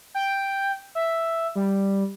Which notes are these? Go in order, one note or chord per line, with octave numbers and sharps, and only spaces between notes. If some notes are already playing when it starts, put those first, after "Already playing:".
G5
E5
G3